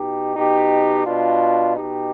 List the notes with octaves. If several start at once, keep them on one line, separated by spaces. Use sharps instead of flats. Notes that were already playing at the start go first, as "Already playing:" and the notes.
Already playing: B2 D#4 G4
B2 D#4 G4
B2 D4 F4
B2 D#4 G4